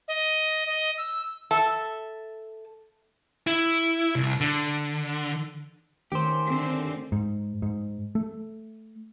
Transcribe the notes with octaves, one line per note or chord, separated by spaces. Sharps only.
D#5
D#5
E6
A4 E5
E4
C2
D3
D#3 A3 C#4 G4 C5
D3 C4 A4
G#2
G#2
A3